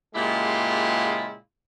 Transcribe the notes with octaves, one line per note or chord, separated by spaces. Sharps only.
A#2 C#3 G#3 E4 F4 G4